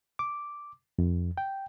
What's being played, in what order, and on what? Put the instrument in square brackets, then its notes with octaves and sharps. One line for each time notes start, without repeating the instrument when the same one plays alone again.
[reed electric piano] D6
F2
G5